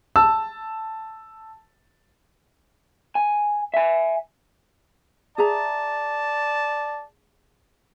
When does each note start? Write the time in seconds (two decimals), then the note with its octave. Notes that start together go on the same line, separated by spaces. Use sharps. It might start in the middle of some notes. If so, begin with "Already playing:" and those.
0.16 A5 E6
3.15 G#5
3.74 E5 G#5
5.38 G#4 D5 E5 A5 A#5